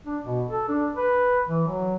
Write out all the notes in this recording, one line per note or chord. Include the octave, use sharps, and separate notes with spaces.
D4
B2
A4
D4
B4
E3
F#3